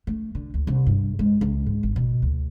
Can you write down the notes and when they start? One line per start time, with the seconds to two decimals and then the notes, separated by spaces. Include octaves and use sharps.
0.07 A3
0.35 D3
0.54 D2
0.67 C2
0.87 G2
1.19 G#3
1.41 C#2
1.67 G#2
1.83 G#1
1.96 B2
2.22 D2